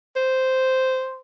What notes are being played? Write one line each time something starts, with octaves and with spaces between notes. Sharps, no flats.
C5